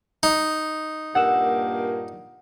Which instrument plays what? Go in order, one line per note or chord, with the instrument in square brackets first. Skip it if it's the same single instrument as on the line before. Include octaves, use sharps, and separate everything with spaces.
[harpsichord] D#4
[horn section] G2 A#2 A#3 [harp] F#5 E6 E7